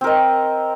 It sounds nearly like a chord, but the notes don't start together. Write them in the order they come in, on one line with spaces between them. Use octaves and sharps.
C4 A#4 D#5